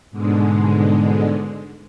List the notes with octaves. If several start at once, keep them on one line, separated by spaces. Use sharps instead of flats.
G#2 B2 D3 G#3